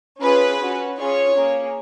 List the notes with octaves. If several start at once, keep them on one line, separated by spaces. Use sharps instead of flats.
C#4 F4 G#4 B4
C#4 F#4
C#4 F4 G#4 C#5
A#3 C#4 G#4